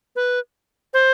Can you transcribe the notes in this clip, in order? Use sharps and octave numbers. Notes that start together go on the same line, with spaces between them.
B4
C5